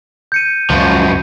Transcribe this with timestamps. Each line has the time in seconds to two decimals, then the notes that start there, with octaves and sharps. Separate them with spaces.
0.32 G6 C#7 D#7
0.70 C#2 F#2 F3